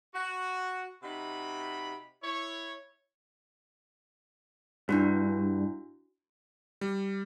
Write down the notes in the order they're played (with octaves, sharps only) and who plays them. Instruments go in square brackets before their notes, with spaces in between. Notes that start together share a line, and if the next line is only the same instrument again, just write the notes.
[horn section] F#4
C3 D#4 F#4 B5
E4 C#5
[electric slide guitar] G2 [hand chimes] D4 E4 F#4
[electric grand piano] G3